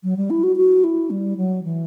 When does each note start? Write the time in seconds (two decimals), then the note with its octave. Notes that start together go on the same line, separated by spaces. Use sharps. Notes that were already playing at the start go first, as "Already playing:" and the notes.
0.03 F#3
0.17 G3
0.30 E4
0.43 F#4
0.57 F#4
0.84 E4
1.10 G3
1.37 F#3
1.64 E3